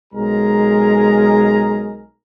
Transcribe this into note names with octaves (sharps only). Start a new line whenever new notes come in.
B1 G#3 G#4 A#4 A#5